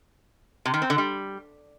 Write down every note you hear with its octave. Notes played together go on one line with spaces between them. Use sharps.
C3
D#3
C4
D3
G3